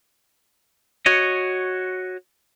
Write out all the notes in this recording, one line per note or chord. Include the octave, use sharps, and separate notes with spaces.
F#4 C#5 D#5